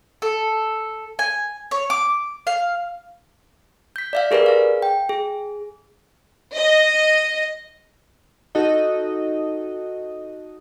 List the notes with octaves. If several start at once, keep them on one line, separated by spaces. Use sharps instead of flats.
A4
G#5
C#5
D6
F5
G6 B6
D5 E5 F5
G4 G#4 A#4 B4 D5
G#4 F5
G5
G#4
D#5
D#4 F#4 A4 D#5